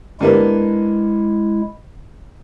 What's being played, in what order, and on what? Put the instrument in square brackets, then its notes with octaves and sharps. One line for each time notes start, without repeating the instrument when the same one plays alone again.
[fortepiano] G2 A#3 B3 [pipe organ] G#3 E4